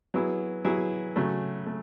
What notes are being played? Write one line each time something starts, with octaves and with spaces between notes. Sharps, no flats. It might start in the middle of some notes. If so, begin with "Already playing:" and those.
F#3 B3 E4 G#4
F#3 B3 E4 G#4
C#3 F#3 A3
A3